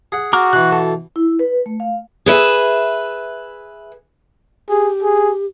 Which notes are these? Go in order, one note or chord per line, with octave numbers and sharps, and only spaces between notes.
G#4 F#5
F#4 A#5 D6 F6
B2 E3 F#6
A4 A5
E4
B4
A3
F5
G#4 B4 E5
G4 G#4
G#4